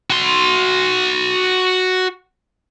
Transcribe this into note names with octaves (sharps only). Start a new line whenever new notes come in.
F#4 C6